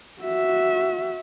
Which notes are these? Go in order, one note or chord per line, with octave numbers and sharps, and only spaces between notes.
F#4 E5